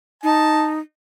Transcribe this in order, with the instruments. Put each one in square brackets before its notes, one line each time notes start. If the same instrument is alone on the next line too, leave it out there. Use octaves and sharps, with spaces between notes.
[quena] D#4 [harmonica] A5